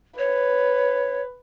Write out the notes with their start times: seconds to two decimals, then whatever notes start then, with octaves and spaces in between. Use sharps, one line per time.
0.18 B4 C#5